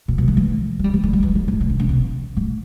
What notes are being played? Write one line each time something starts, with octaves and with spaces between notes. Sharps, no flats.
A#2
B2
D#3
E3
G#3
G3
E3
D#3
G3
E3
D#3
G#2
B2
C#3
C#3
B2
G#2